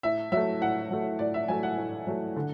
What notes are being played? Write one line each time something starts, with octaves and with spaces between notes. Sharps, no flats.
A2 E5
F#3 A3 E5
A2 F#5
F#3 A3
A2 D5
E5
F#3 A3 G#5
F#5
A2
F#3 A3
D3